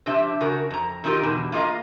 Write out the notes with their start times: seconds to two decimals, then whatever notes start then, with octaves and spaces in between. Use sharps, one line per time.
0.06 C3 F3 D4 G4 E5
0.40 C#3 F#4 A#4
0.70 F2 A#5
1.04 D#3 C4 D#4 F4 G4 A#4
1.23 E2 B2 D3
1.52 A#3 F4 G#4 D#5 F5 A#5